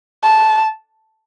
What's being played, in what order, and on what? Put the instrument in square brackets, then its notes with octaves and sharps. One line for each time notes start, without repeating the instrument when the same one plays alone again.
[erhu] A5